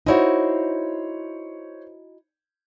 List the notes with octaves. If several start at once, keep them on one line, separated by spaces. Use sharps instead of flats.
D#4 E4 F#4 C5 C#5